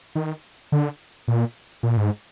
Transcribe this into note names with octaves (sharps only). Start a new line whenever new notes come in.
D#3
D3
A#2
A#2
G#2